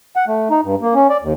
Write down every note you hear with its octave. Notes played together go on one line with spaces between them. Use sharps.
F#5
A3
D#4
G2
A#3
C#4
D5
D#2